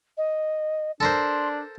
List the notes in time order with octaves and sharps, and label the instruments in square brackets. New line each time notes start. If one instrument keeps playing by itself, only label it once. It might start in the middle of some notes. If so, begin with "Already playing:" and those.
[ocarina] D#5
[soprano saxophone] D4 [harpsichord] A4 A#4 C5 [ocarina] C6